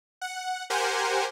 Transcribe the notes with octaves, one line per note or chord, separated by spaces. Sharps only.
F#5
G4 A#4 C5 F#5 G#5